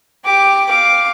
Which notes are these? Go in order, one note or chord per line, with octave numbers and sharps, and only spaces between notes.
G4 D6
F5 D6